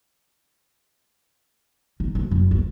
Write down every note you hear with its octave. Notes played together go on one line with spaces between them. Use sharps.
D#3
D2
F#2
D2